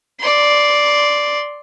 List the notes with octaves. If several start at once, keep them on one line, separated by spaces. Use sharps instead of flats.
D5 C6